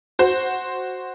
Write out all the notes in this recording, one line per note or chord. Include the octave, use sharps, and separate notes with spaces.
F#4 C5